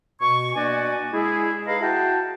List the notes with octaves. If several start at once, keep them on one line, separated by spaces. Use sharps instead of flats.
B2 C#6
B2 A#3 D4 F#4 D5 G#5
G#3 E4 G#4
D#4 G#4 B4 F5 A#5 B5
E4 F#4 F#5 G5 A5